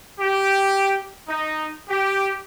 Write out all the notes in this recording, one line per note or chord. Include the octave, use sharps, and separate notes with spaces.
G4
D#4
G4